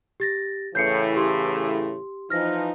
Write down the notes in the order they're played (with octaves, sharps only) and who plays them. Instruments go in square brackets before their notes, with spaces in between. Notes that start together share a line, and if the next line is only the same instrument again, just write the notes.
[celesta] G4 A6 A#6
[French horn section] A2 C#3 E3 [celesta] G6 C7 C#7
[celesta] G4 C6
[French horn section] E3 F3 D#4 [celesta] F6 A#6